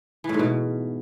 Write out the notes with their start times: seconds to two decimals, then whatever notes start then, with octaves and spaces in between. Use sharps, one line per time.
0.24 E3
0.29 A2
0.34 G#2
0.39 B2